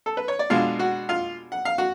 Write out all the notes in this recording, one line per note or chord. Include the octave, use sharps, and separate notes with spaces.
A4
B4
C#5
D5
B2 G#3 D4 F4 F5
F#4 F#5
F4 F5
F#5
F5
F#4 F#5